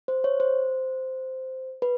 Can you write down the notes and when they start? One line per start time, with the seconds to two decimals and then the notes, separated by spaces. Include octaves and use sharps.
0.08 C5
0.24 C#5
0.40 C5
1.82 B4